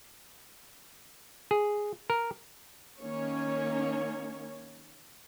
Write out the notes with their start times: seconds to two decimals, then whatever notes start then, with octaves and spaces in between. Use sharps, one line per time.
1.51 G#4
2.10 A#4
3.01 D#3 A#3 C#4 C#5